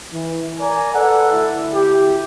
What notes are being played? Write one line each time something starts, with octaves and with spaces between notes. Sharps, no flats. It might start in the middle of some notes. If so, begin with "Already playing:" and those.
E3
A#4 D5 G#5 A#5
A4 B4 D5 F#5
D2 E4
G4